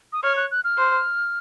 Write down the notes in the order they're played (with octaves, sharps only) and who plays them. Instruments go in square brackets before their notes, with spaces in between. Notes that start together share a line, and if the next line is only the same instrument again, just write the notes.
[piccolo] D#6
[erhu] C#5 [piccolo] F6
[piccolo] F#6
F#6
F6
[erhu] C5